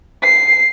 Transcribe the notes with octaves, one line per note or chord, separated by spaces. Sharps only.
C7